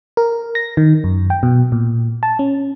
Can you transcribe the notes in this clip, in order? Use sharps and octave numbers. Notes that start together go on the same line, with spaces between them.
A#4
A#6
D#3
F#2
G5
B2
A#2
A5
C#4